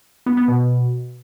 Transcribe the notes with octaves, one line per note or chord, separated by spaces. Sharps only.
B3
B3
B2